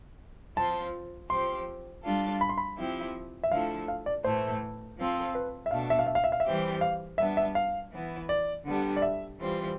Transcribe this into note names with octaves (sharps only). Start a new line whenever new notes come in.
F3 C4 F4 A5
F3 C4 G4 C6
G3 D4 F4 A4
B5
C6
B5
F3 C4 E4 G4
E5
D3 F3 A3 E4 A4 F5
F5
D5
A2 E3 A3 C5
F3 C4 F4 A4
B4
E5
B2 A3 D4 F5
E5
F5
E5
F5
E5
F5
E5
E3 G3 C4 G4
F5
G3 B3 D4 E5
E5
F5
E3 B3 E4
D5
D3 G3 B3 D4
D5
E5
E3 G3 C4 F4